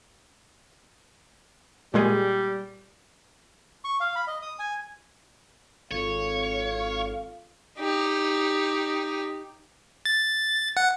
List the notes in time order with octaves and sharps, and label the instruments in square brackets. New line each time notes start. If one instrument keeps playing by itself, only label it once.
[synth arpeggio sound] A#2 G#3 G#4 [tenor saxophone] G3
[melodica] C#6
F5
B5
D#5
D#6
G#5
[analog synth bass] G#1 [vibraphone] C4 F4 A4 [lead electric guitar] C#5 [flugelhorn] F5
[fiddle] D#4 G4
[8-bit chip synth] A6
F#5